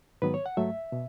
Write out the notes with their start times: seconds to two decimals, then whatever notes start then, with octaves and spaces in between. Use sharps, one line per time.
0.22 G#2 D#3 F#3 B3 B4
0.34 C#5
0.46 F#5
0.57 G#2 F#3 A3 E5
0.92 B2